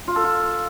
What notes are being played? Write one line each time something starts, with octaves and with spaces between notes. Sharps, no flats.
F4
A4
F4